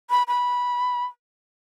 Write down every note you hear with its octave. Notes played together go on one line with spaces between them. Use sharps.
B5
B5